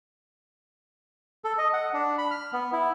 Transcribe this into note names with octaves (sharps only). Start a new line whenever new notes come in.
A4
D#5
F#5
D4
B5
F6
B3
E4